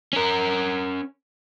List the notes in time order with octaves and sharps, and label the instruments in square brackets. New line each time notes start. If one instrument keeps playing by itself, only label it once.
[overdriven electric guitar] C#4 A#4